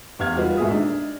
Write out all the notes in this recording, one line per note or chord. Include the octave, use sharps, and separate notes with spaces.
E2 G4 F5 F6 G#6
G3 D#4 F4 F#4 B4
G#1 A#2 G#4 E5 D#6
D4 D#4 D#5